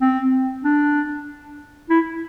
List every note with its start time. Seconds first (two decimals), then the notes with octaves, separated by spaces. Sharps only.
0.01 C4
0.64 D4
1.90 E4